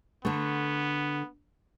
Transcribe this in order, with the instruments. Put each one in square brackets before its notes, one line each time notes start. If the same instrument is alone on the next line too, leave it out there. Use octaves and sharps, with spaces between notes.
[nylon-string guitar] D3 A3 [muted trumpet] B3